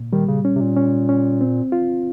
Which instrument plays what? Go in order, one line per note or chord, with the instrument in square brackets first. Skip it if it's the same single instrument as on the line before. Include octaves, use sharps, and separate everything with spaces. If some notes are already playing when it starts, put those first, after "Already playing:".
Already playing: [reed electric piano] A#2
[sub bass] D#3 [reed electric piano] G3
[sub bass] C#3
[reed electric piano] C#4
[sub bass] C3
A#2
[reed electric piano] C#4
C#4
C4
F4